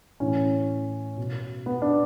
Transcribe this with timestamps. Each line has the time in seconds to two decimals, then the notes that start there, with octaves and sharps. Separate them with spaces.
0.20 A2 E3 C#4
1.17 B2
1.66 B3
1.82 D4